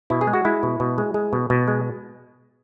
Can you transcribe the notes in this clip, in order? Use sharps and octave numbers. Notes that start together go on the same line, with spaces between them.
B2 E4
G#4
G#3
F#4
G#3 E4
B2
B2
G#3
G#3
B2
B2
G#3